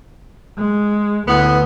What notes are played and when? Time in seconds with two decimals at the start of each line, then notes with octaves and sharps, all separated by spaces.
0.58 G#3
1.28 D2 A2 B3